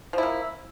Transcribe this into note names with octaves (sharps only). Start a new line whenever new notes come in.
F3 A#3 E4